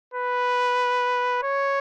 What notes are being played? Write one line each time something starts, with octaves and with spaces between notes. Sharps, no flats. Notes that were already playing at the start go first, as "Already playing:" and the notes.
B4
C#5